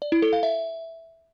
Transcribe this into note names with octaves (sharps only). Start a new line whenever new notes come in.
D5
E4
A4
F5
E5